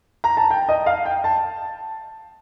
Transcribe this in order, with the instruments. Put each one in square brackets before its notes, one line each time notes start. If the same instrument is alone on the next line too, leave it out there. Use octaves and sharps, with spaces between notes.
[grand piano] A#5
A5
G5
D#5
F5
G5
A5